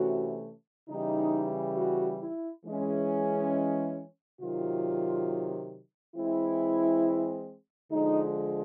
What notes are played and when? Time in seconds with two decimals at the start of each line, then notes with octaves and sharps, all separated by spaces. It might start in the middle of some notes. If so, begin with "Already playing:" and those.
Already playing: C3 E3 A3 C#4 F#4
0.88 C#3 E3 G3 D#4
1.76 F#4
2.20 E4
2.64 E3 G#3 C#4
4.40 C3 D#3 F#3 F4
6.15 E3 G#3 C4 E4
7.91 D3 F3 G#3 D#4